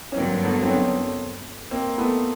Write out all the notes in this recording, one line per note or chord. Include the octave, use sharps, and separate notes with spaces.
C#4
G2 D3 F#3 A#3 C4
A3 B3
C4
B3 C#4
A#3 C4
A3 B3